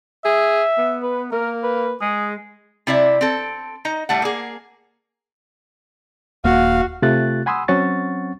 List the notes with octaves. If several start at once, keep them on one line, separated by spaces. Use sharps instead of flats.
G#4 E5
B3
B4
A#3 A#4
B4
G#3 G#4
C3 E4 D5 E5
C4 A4
D#4 D#5 A#5
A2 G3 A3 F#5
A#3 G#4
D#1 A#3 F#4 F5
C3 A3 F4 G4 F#6 A6
F#5 G#5 B5 C6 D#6 E6
F#3 C4 C#4 F#5 C#6 A6